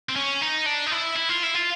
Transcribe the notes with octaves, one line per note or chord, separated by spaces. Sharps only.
C4
C#4
D#4
D4
D#4
E4
E4
F4
E4
F4